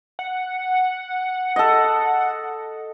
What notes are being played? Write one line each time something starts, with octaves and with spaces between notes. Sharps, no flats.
F#5
A4 D#5